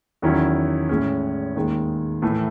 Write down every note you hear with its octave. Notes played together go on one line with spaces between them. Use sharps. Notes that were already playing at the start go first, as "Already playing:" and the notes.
E2 D#3 F#3 C#4 E4
A2 G#3 C#4
D#2 D#3 G#3
A2 E3 A3